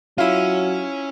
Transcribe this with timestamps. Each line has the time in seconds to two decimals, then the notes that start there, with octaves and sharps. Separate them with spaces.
0.18 F#3 C#4 E4 F4